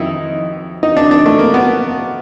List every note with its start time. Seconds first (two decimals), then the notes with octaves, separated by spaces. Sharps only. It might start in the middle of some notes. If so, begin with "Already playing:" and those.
Already playing: F2 D#3 D#4 E4
0.83 D#4
0.97 D4
1.11 D4
1.26 A3
1.39 A#3
1.54 B3